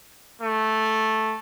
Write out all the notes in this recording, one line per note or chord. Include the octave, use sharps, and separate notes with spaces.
A3